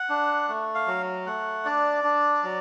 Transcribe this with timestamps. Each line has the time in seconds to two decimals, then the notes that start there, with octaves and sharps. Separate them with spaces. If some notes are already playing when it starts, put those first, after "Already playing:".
Already playing: F#5
0.09 D4
0.48 A3
0.75 F5
0.87 F#3
1.26 A3 F#5
1.65 D4 D5
2.04 D4
2.43 F#3